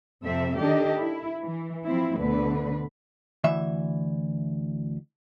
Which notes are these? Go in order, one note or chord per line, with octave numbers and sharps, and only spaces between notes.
F2 C3 C4 A4 E5
D#3 D4 G4 A4 D#5
E4
E3
F3 C4 E4
D2 B2 D3 B4
D2 E3 E5